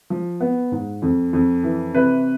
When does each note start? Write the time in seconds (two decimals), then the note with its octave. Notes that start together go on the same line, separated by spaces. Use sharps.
0.10 F3
0.40 B3
0.72 G#2
1.02 F2
1.33 F2
1.63 E3
1.94 C3 B4